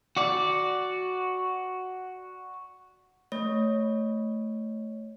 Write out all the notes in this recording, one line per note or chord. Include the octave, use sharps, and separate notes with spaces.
F#4 D5
A3 C#5